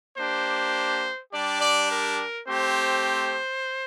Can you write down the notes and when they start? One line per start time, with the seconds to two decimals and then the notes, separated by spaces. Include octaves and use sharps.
0.17 A#3 D4 G4 C5
1.32 G3 D4 G4 D5
1.61 D5
1.90 A#4
2.47 A3 C4 G4 C5